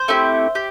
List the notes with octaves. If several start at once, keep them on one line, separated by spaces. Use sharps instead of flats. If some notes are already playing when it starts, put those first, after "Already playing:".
Already playing: C5
A3 C4 E4 G4
G4